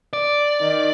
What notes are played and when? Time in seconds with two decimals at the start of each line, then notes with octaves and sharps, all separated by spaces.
0.13 D5
0.61 D#3